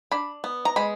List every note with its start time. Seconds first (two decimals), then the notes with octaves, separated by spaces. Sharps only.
0.12 D4 B5
0.44 B3
0.65 A#5
0.76 G#3 B5